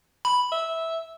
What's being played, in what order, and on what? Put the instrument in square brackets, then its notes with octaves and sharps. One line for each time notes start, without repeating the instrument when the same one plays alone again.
[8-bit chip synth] B5
[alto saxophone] E5